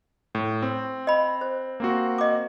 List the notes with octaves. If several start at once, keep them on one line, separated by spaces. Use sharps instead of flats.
A2
C4
D#5 B5
C5
A#3 C4 F#4
D#5 D6